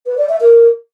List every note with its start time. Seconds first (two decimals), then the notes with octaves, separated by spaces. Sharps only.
0.06 B4
0.17 D5
0.29 E5
0.40 A#4